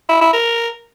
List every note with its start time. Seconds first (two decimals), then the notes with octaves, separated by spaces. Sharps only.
0.09 E4
0.21 E4
0.33 A#4